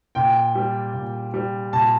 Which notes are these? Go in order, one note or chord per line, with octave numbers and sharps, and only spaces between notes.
A#2 G5
G3
A#2
G3
A#2 A5